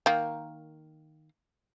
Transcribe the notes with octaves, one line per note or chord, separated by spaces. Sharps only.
D#3 A#3